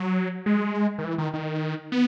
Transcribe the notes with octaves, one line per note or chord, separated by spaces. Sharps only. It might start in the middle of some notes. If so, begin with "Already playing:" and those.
Already playing: F#3
G#3
D#3
E3
D#3
D#3
B3